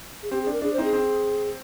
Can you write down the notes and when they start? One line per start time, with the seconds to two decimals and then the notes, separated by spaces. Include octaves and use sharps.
0.22 G#4
0.31 C4 G4
0.41 G#4
0.47 D4 A#4
0.62 D4 G#4
0.73 C5
0.78 C4 D#4 G#4
0.93 C4